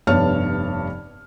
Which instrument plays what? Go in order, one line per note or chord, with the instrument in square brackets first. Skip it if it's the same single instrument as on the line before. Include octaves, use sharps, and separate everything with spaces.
[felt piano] F1 G2 B3 C#5 A5 F6